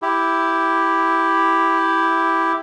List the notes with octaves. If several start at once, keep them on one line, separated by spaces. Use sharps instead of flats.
E4 G4